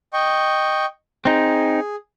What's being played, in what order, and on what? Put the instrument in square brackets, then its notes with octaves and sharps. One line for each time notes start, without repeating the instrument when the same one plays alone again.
[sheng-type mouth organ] D#5 G5 C#6
[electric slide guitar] C4 D#4 [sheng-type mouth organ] G#4